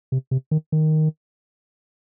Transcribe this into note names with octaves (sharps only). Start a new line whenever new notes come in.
C3
C3
D#3
D#3